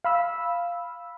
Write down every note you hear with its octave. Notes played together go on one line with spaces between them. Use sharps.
F5 B5 E6